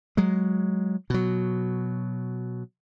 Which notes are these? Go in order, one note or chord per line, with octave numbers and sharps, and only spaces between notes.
F#3 G#3
B2 F#3